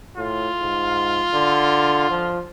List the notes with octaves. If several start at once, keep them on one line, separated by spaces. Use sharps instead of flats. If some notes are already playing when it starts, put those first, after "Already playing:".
A2 F4
G#2
D3
F3